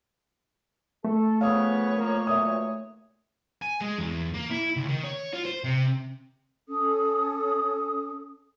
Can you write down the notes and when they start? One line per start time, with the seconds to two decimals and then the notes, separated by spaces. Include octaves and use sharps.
1.05 A3 A4
1.41 C#3 F3 B3 C#5 F5 D#6
1.95 F2 F3 A#3
2.27 B1 A#2 E5 D#6
3.62 G#5
3.81 G#3
3.98 E2
4.34 A#3
4.50 E4
4.76 C#2
4.89 D#3
5.04 C#5
5.33 F4
5.45 C5
5.64 C3
6.67 C#4 A4 D#6